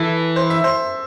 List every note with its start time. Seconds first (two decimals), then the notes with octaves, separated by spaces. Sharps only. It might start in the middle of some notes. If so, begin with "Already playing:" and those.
Already playing: E3 A4
0.36 C5
0.50 E5
0.64 C5